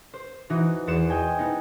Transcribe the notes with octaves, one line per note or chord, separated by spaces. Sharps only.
C5
E3 D#4 F#4
E2 C5 C7 C#7 E7
D#5 G5 G#5
B3 D#4 E4